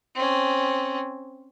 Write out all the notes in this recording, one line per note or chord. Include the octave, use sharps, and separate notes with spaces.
C4 C#4